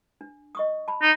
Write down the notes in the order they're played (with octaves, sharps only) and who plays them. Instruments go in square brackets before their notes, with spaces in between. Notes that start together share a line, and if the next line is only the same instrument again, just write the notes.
[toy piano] D4
D#5 C#6 D#6
A5 B5
[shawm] D#4